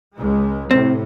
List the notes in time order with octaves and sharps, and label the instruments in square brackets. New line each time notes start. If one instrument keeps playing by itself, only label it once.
[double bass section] C#2 G#3
[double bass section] A2 C3 [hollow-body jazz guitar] C4